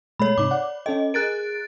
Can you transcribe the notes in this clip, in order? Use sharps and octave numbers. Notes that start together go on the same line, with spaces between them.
B2 G#3 A3 C#5 B5
G#2 C3 D#4 D6
D5 F#5
C#4 A4 D#5 G5
G#4 A#4 F#6 A6 D7